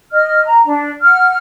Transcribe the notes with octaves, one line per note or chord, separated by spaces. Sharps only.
D#5 F6
A#5
D4
F#5 F6